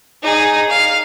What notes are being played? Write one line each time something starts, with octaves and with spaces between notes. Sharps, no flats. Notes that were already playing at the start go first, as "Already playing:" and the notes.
D#4 G#4
F5